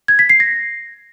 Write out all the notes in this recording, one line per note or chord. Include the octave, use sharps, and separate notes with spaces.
G#6
B6
C7
A#6